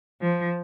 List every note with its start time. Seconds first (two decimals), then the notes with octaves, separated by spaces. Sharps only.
0.20 F3